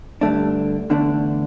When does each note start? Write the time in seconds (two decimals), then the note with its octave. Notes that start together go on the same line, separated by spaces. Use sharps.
0.21 G2 D3 A3 D4
0.90 E2 D3 A3 D4